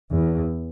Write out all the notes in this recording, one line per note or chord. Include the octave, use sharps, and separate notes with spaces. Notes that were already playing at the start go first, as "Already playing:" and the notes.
E2